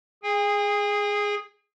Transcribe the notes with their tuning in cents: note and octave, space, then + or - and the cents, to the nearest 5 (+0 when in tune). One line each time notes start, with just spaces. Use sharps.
G#4 +0 G#5 -45